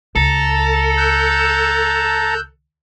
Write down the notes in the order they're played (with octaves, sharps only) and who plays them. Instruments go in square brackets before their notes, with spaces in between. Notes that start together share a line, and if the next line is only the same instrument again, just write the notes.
[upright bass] C#2 [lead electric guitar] A4 [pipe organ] A5 A#5
[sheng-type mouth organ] E6 F#6 G6